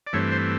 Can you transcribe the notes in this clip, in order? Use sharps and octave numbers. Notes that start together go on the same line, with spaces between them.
D5
G2 E3 A3 C4 C#5
C5